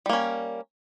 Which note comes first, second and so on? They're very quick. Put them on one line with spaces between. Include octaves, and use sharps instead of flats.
G3 A#3 C#4